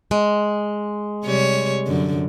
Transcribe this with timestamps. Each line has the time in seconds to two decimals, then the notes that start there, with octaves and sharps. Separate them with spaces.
0.11 G#3
1.24 C3 G3 C#5
1.87 F#2 D3